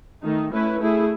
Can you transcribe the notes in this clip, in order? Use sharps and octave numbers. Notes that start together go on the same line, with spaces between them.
D#3 A3 D#4
A3 C#4 E4 B4
A3 E4 G#4